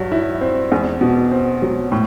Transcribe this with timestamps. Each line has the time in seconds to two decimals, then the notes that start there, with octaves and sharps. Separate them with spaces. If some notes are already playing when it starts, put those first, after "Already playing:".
Already playing: G2 F#3
0.12 E4
0.41 C4
0.72 E2
1.01 B2
1.31 C4
1.62 F#3
1.92 A2